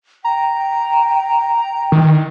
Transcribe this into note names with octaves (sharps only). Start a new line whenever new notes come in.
G5 A#5
D#3